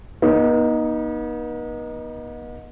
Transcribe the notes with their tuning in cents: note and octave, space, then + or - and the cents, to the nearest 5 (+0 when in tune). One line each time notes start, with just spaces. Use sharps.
B3 -45 D#4 +0